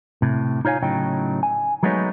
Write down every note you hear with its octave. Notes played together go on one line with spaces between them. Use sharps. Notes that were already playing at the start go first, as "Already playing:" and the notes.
A2 C3
D#4 F4 C#5 F5 G#5
A2 C#3 F#3 D#4 G5
G#5
F#3 G#3 A3 B3 D#4 C#5